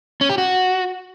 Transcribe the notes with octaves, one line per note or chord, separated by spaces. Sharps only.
C#4
G4
F#4